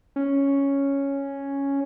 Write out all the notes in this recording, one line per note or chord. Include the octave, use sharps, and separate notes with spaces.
C#4